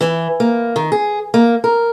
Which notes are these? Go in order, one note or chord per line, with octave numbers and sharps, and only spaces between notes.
E3
A#3
D#3
G#4
A#3
A#4